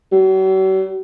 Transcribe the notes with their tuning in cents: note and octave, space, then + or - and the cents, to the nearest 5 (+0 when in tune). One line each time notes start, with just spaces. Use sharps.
F#3 +45